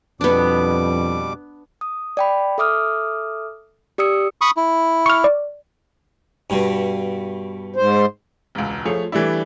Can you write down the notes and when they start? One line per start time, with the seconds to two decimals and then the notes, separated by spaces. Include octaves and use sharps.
0.21 F2 B2 G3 B3 D4 D6
1.81 D#6
2.17 D5 G5 B5
2.58 A4 E5 D6 D#6 F6
3.98 G4 D5 D#6 E6 C#7
4.41 B5 C#6 D#6
4.57 E4
5.06 C#6 F6
5.24 D5
6.50 G2 B2
7.76 G#2 C5
8.55 E1 C#2
8.85 F3 A3 G#4 C#5
9.12 E3 G3 A3 D4 E4